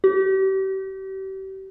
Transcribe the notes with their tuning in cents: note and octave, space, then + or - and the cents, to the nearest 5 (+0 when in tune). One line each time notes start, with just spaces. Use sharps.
G4 -35